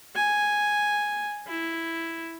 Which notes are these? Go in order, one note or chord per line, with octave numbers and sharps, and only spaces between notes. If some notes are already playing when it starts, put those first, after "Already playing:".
G#5
E4